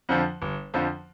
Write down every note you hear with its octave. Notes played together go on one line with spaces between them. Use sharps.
F2 D3 F3
G1
F2 D3 F3